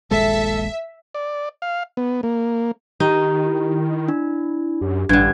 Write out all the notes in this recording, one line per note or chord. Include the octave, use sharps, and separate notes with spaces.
D#1 A#1 G#3 A4 E5
D5
F5
B3
A#3
D#3 D#4 G4
E4
D4
F#2 G4
A1 G2 D3 G#6